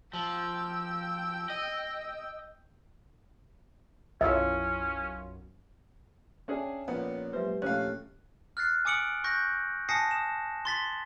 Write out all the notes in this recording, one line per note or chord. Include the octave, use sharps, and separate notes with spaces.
F3 G5 E6
D#5
B1 F#2 C#4 E4 F4 C#5 E5
C#4 D4 G#4 E5 G5
A#1 A#2 B3 C#4 C#5
F#3 G#3 G4 B4 C5 E5
A#1 A3 C#4 D4 G4 F5 G5 F#6
F6 F#6 A6 C7
G#5 D6 D#6 C#7 D7 F#7
C#6 F#6 G6 A#6
G#5 A5 D#6 A#6 C7 C#7
D#6 E7
C6 A6 B6 F#7